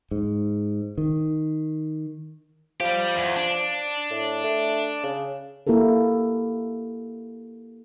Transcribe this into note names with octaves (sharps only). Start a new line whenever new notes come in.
G#2
D#3
F3 G3 G4
E2
D4
A2
A3
C#3
A#3 E4 G4 A4 A#4